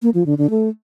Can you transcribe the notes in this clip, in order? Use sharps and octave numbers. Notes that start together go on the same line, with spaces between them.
A#3
F3
D3
D3
A3